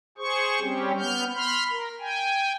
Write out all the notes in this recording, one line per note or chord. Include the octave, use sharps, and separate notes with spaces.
G#4 C5 C#6
G3 C4 C#4 G4
B3 F6 G6
B5 C6 F6
A#4
G5 G#5